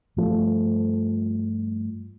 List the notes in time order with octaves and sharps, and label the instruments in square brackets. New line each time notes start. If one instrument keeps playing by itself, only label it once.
[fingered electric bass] G2 F3 A3